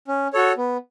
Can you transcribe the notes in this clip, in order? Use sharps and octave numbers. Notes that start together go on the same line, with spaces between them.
C#4
F#4 A4 C#5
B3